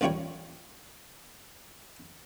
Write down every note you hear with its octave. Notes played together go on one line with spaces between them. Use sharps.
A1 D#2 G3 F4 C#5 G5